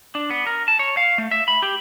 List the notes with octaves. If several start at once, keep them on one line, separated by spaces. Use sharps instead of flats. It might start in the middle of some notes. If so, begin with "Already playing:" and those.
D4
B3
A#4
A5
C#5
F5
A3
E5
B5
G4